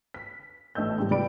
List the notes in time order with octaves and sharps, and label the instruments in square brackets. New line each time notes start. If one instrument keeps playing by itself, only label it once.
[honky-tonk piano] B6
A1 A3 D#5 E6 G6
G#2 G3
G1 G3 D5 G5 B5 D7